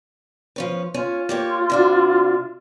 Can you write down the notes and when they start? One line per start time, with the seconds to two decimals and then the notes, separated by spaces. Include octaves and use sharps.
0.56 F3 C#4 B4
0.94 C#4 F4
1.29 A#3 G4 C#5
1.70 C3 D4 F#4